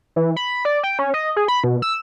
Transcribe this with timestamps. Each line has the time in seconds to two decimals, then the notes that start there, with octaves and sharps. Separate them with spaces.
0.16 E3
0.36 B5
0.65 D5
0.83 G5
0.99 C#4
1.14 D#5
1.36 G#4
1.48 B5
1.64 B2
1.82 E6